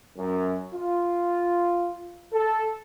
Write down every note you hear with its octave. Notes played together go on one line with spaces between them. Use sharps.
F#2
F4
A4